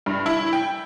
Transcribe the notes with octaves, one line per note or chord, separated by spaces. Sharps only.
G2
E4
G5